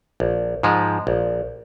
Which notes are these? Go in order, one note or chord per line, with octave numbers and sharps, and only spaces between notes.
A#1
G#2 F3 G#3
A#1